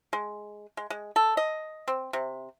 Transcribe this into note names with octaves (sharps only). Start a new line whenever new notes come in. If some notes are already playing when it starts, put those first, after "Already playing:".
G#3
G#3
G#3
A4
D#5
C4
C3